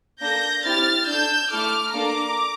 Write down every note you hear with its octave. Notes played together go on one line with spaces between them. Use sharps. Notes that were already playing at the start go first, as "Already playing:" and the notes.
A#3 D4 A4 G6 A#6
C4 E4 G4 F6 A6
D4 A4 E6 G6
A3 E4 A4 D6 F6
A#3 D4 A4 A#5 D6